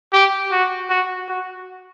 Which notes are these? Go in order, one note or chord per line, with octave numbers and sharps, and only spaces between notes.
G4
F#4
F#4
F#4